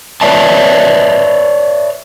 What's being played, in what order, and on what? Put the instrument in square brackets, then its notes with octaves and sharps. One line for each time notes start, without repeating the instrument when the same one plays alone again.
[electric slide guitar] B4 C#5 D5 E5 A5